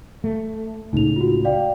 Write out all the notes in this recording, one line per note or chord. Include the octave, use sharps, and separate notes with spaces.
A3
C#2 A2 C#3 D#4 F7
F4 F#4
D5 F5 G5